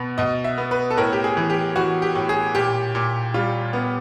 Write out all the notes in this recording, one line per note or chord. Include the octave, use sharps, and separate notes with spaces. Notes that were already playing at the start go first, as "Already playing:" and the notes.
Already playing: B2 B3
B2 D#5
E5
B3
B4
A4
A2 A#4
G4
G#4
E3
G4
E3 F#4
G4
A2
G#4
A#2 G4
A#2
G3 F4
B3